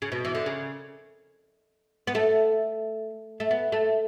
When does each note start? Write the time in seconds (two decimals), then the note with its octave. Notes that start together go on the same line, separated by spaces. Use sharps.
0.02 C#3
0.12 B2
0.25 E3
0.35 D3
0.46 C#3
2.07 B3
2.15 A3
3.40 A3
3.51 B3
3.72 A3